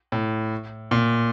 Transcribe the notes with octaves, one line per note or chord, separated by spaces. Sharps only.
A2
A#2